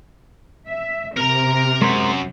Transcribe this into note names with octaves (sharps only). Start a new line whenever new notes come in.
E5
C3 A#4 A#5
F#2 G#3 A#4 C5